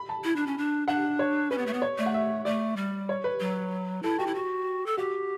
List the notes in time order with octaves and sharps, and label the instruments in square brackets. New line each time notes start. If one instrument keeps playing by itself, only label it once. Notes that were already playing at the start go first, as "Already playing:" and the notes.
Already playing: [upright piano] B5
A5
[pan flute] E4
D4
C#4
D4
[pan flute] D4 [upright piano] F#5
[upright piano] C#5
[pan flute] C#4 [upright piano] B4
[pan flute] B3
A3
B3
[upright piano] C#5
[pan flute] A3 [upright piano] D5
[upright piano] F#5
E5
[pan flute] A3 [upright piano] D5
[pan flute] G3
[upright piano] C#5
B4
[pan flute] F#3
[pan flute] E4 [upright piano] A4
[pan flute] F#4 [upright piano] G4
[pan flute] E4
F#4
A4
[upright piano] F#4 [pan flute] G4